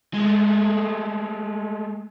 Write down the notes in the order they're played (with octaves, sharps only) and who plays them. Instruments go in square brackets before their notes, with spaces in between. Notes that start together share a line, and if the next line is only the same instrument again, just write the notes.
[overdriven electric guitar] G#3 A3